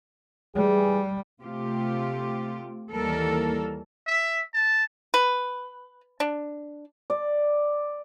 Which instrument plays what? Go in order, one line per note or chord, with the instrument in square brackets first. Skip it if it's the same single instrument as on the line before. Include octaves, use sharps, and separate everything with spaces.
[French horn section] E3 G#4 [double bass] G3
[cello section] C3 A3 F4 G4
D#2 E3 G3 A4 A#4
[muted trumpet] E5
A5
[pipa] B4
D4
[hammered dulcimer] D5